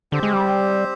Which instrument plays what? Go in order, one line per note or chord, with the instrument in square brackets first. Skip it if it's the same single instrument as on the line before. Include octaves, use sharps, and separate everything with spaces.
[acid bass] D3 [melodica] C4 G4 C5
[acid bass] G#3
G3